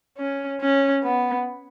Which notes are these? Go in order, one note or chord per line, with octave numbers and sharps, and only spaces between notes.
C#4
C#4
B3